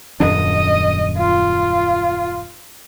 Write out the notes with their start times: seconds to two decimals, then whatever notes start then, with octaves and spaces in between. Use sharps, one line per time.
0.20 D#1 F#2 D4 D#5
1.17 F4